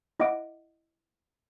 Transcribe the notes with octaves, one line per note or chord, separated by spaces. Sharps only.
E4 D#5 E5 F#5 D6 D7